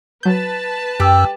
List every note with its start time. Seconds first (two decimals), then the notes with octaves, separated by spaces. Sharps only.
0.23 F#3 B4 A5 G6
1.00 F#2 G4 E6